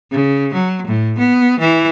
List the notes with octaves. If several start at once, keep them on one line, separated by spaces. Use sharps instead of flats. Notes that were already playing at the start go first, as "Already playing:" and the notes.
C#3
F#3
A2
B3
E3